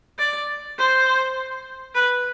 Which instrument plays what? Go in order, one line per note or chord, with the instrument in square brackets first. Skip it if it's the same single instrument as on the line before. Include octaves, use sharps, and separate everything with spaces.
[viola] D5
C5
B4